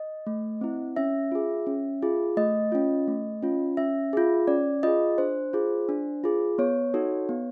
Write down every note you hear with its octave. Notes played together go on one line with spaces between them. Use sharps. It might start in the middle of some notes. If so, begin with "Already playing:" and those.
Already playing: D#5
A3
C4 E4
C#4 E5
F4 G#4
C#4
F4 G#4
A3 D#5
C#4 F4
A3
C#4 F4
C#4 E5
F4 G#4
C#4 D5
F4 G#4 D#5
D4 C5
F4 G#4
D4
F4 G#4
B3 C#5
D#4 F#4 A4
B3